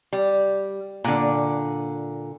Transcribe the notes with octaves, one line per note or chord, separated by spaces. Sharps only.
G3
A#2 D3